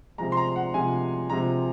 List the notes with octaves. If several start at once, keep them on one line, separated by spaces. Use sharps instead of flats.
C3 F3 G#3 A#5
C6
A#5
F#5
C3 F3 G#3 G#5
C3 F3 G#3 A#5